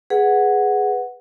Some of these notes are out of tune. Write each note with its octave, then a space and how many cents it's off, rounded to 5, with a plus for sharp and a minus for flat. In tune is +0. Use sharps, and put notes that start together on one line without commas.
G#4 +0 B4 +0 F#5 +0